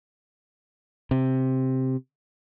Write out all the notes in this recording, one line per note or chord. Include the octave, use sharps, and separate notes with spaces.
C3